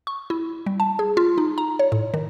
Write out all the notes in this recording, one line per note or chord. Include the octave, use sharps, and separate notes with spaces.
C#6
E4
G3
A5
G#4
F4
D#4
A#5
C#5
A2
D#3